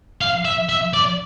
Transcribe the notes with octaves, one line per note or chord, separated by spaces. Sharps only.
F5
E5
E5
D5